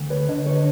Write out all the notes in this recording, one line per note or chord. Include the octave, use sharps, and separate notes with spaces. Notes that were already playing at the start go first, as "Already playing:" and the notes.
Already playing: D2
B4 C#5
D3 C#5 D#5
B4 C#5